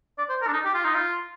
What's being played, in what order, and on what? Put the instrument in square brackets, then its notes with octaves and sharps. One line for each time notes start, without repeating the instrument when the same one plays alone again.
[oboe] D5
C5
A#4
D4
D#4
G4
F4
D#4
F4